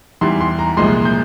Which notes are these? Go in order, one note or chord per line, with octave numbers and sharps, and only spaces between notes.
E2 E3 G3 C6
C6
A#5
C2 A#2 F3 G#3 C6
G6